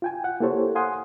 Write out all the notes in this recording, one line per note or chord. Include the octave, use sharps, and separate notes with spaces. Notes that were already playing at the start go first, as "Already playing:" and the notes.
F4 G5 G#5
F#5
A#3 E4 G4 A4 C5 C#5
F5 F#5 G#5 C6 D#6